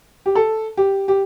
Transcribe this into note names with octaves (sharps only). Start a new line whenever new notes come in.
G4
A4
G4
G4